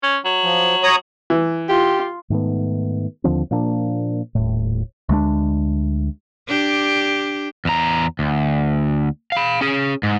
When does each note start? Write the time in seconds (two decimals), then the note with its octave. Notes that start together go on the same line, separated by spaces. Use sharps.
0.03 C#4
0.25 F#3
0.43 F3
0.83 C#5 A#5 D#6
1.30 E3
1.69 F4 G4
2.30 G#2 D#3 A3 B3
3.24 D#2 D3 F3 C4
3.51 A#2 F3 A#3 D4
4.35 D#1 A2
5.09 D2 G#3 A3 D4
6.48 D4 G4
7.65 E2 A#5
8.19 D2
9.32 F5 B5
9.61 C#4 G#4
10.03 G#2